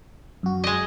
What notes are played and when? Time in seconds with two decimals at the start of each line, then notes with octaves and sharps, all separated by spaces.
0.43 F#2 F#4
0.64 G#3 D#5